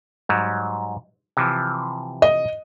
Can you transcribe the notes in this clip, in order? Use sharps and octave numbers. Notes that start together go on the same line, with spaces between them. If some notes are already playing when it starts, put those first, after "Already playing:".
G#2 F#3 G3
C3 E3 F3
D#5